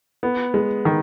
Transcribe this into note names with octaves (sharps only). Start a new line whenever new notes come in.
B3
G#3
D#3